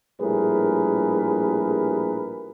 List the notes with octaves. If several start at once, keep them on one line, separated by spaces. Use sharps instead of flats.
A#1 A2 G3 G#4 A#4 B4